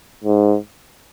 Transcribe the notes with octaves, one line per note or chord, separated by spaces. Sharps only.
G#2